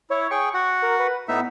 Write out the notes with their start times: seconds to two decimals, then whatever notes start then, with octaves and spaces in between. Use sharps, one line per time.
0.10 E4 C#5
0.31 G#4 G5 C#6
0.54 F#4 F#5
0.82 A#4
0.99 B4
1.29 A2 B3 D#4 E5